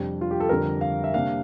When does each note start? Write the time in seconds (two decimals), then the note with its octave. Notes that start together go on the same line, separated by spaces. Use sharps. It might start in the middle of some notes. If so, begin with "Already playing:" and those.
Already playing: F2 C3 G3 D4
0.21 F4
0.31 G4
0.40 A4
0.49 F2 D3 G3 D4 A#4
0.81 F5
1.04 E5
1.14 C3 G3 A#3 D4 F5